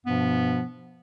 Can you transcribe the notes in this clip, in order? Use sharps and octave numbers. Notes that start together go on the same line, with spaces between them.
G2 B2 F3 B3